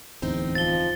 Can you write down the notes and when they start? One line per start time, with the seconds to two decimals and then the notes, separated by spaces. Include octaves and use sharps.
0.22 D1 E2 C4 D#4
0.55 F3 A6 G7